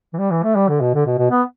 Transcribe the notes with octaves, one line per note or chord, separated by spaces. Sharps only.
E3
G3
E3
A3
G3
D3
B2
D3
B2
B2
B3